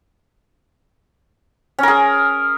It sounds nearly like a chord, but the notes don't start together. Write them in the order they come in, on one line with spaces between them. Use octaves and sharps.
C#4 A#4 G#4